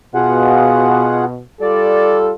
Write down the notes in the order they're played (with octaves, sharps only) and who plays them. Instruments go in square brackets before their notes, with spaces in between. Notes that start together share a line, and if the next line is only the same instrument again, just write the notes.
[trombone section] B2 [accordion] F4 G#4 F#5
[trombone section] G3 F4 A4 [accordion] D5